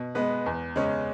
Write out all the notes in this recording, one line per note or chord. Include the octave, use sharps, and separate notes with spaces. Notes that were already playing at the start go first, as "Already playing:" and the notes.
Already playing: B2
G#3 B3 B4
E2
C#3 G#3 C#4